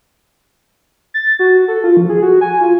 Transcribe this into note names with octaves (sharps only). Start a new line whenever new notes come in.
A6
F#4
A4
F4
F3
G#4
F#4
G#5
F4